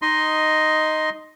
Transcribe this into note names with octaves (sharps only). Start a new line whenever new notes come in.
D#4 D#5 C6